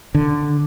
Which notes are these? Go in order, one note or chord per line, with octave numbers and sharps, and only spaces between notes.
D3